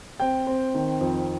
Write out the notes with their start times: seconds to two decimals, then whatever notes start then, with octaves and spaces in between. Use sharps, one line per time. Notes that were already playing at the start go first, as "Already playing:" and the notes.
0.20 C4 G5
0.47 C4
0.74 D#3
1.01 F2